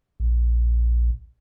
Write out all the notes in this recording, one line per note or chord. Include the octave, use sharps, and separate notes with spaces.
A#1